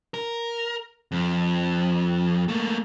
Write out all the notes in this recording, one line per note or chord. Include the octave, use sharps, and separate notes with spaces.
A#4
F2
A3 A#3